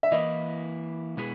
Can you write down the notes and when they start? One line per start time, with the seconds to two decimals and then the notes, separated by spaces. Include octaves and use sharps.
0.03 E5
0.12 E3 A#3 E4 D#5
1.17 B2 G#3 B3 E4 G#4